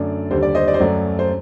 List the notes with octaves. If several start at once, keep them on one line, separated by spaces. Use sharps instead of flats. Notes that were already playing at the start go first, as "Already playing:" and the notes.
Already playing: F#2 D3 A3 D5
D#2 D3 G3 C5
D5
C5 D#5
D5
C5
F#2 F#3 A3 D5
C5